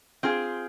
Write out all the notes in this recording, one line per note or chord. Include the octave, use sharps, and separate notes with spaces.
C4 F4 G#4